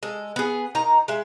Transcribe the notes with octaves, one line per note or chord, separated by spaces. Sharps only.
G#3 A4
B3 G#4
D#3 D#4 A#5
G#3 E5